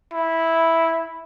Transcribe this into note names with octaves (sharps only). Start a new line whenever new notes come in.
E4